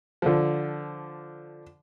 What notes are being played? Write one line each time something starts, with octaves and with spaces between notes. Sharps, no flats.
D3 F3